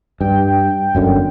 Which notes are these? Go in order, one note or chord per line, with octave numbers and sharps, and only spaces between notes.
G2 G5
G1 F#2 D3